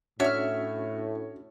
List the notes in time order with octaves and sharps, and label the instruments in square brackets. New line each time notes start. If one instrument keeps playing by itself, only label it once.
[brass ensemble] A2 [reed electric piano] C#4 D4 F#4 [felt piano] C#5 [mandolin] E5 F6